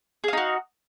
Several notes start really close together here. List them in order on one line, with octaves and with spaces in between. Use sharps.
G#4 F5 D#4 F#4